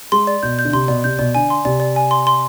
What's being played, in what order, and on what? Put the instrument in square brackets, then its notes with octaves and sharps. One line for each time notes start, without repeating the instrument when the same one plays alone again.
[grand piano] G#3 [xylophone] C6
[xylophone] D5
[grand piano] B2 [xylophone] G6
[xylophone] G6
[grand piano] D3
[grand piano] C3 [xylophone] C6
[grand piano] B2 [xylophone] D5
[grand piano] C3 [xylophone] G6
[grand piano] B2 [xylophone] D5
[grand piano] D3 [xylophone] G#5
[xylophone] C6
[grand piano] C3 [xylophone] D5
[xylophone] D5
G#5
C6
C6